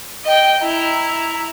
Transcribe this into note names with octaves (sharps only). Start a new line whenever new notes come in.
D#5 G5
E4 A#5